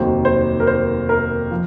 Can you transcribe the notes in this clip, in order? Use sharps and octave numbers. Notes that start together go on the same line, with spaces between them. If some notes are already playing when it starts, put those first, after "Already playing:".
Already playing: F1 D#2 D#3 F#3 C5
C5
A#4
C5
A#4
F3